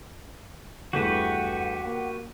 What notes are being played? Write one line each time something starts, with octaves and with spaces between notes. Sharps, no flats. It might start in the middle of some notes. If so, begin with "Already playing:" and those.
E2 G2 A3 F#4 G4 B4 F#5
A#3